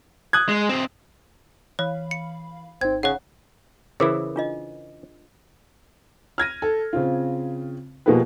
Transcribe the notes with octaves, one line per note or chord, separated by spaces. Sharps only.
D#6 F#6 G#6
G#3
B1 C4
E3 C#5 F5 B5
C#7
G#1 C4 D#4 G#6
C#3 C#5 F#5
C#3 E3 E4 G#4 A#4 C5
D4 F4 D#5
F6 G#6 A#6 D#7
A4
C#3 C4 F4
B2 F3 A#3 G4 G#4 B4